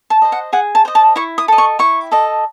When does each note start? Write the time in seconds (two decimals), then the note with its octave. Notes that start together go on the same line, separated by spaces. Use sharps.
0.10 A5
0.22 C5 D#5
0.32 F#5
0.53 G#4 F#5
0.75 A5
0.85 C5 D#5
0.95 A5
1.16 E4 C#6
1.38 D#6
1.48 A4 D#5
1.58 C#6
1.79 E4 C#6
2.12 A4 D#5